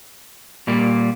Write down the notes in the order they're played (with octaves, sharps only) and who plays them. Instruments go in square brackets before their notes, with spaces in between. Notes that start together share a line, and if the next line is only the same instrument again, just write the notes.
[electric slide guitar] A#2 G3 A#3